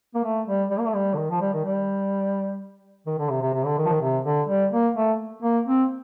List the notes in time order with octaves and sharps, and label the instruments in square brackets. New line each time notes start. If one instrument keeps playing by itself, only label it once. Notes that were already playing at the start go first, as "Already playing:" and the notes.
[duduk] A#3
A3
G3
G3
A#3
A3
G3
D3
D#3
F3
G3
D#3
G3
D#3
D3
C3
C3
C3
D3
D#3
F3
D#3
C3
D3
G3
A#3
A3
A#3
C4